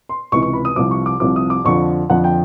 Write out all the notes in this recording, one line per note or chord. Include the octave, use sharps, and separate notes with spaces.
C6
C#2 C3 E3 C#6
C#6
B5
D#6
C2 C3 F3 D6
C#6
D6
C2 C3 F3 D6
D#6
D6
F2 D3 F3 C#6
F2 D3 F3 F#5
G5